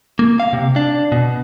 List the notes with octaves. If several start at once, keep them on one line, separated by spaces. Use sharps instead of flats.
A#3
F5
C3
D4
B2